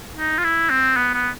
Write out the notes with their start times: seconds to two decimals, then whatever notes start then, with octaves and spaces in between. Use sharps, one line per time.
0.17 D#4
0.38 F4
0.44 E4
0.70 C4
0.96 B3
1.14 B3